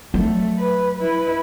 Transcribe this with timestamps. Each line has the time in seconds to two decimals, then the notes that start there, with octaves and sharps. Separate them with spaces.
0.14 F#3 A3
0.59 B4
0.99 E4 B4